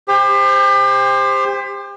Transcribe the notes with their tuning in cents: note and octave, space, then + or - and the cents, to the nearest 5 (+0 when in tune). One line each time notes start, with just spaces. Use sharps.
G4 +35 C5 +0